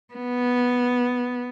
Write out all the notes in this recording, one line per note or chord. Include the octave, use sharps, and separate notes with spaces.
B3